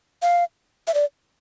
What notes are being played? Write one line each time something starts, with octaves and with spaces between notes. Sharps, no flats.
F5
E5
D5